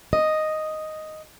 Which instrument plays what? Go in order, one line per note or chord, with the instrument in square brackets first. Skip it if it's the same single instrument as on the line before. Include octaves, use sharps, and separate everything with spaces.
[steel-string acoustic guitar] D#5